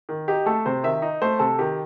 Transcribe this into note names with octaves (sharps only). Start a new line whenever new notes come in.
D#3
D#4 G4
A3 A4
C3 C5
D#3 E5
D#4
A3 C5
C3 A4
D#3 G4